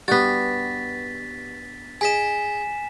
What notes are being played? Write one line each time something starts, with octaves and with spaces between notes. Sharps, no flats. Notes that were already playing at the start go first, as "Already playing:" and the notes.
G2 B3 F#4 G4 A6 B6
G#4 D#5 G#5 B6 E7